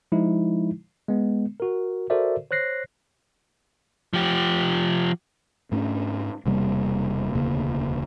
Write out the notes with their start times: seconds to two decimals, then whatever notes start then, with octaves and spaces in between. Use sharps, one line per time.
0.12 F3 G#3 D#4 E4
1.08 G#3 B3
1.60 F#4 A#4
2.10 F#4 A4 A#4 C5 D5 E5
2.51 C5 C#5 F#6 A#6 C7
4.13 F3 G4
5.72 G#2 A3 C#4 D4
6.45 E1 C3 G3 A#3
7.33 E1 D2 C#3 A#3